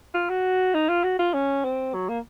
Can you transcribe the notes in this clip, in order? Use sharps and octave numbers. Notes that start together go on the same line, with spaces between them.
F4
F#4
D#4
F4
F#4
F4
C#4
C4
F#3
A#3